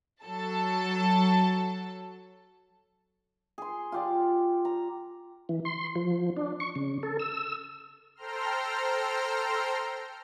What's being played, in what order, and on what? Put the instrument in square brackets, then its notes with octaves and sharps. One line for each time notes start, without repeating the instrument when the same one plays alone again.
[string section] F#3 A4 A5
[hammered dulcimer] G#4 C6
F4 G4 D5
A#5
[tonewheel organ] E3
C6
F3
D4
C#6
C#3
A4
E6
[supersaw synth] A4 C5 G5 A#5 C6 F6